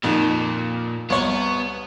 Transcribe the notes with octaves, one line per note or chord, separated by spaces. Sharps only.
F2 A#2 D#3
C2 B3 C#5 C#6